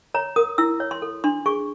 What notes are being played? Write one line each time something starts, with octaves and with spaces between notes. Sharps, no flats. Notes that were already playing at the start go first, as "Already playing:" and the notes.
C#5 A#5
A#4 D#6
E4 E6
C#5
C6
A4
D4 C6
G#4 C#6